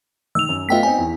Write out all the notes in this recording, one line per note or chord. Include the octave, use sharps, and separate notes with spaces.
D#3 E6 F7
F#2
A3 B3 F4 D#5 G5 B6
C4 D#4 G#5
E2